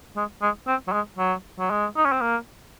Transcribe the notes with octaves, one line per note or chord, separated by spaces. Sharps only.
G#3
G#3
C4
F#3
G#3
F#3
F#3
G#3
D#4
C#4
C4
A#3